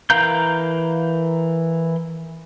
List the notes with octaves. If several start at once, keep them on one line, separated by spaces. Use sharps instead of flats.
E3 A#4 F5 A#5 G6